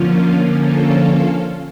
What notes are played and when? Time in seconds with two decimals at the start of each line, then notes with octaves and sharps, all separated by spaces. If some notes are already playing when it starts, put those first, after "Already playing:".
Already playing: D3 F3 A#3 C#4 F4
0.60 F4 A4